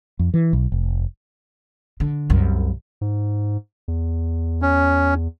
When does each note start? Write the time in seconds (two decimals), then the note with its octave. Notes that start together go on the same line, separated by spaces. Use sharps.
0.19 F2
0.34 E3
0.53 B1
0.72 F1
2.00 D3
2.30 C2 F#2
3.01 G#2
3.88 E2
4.62 C#4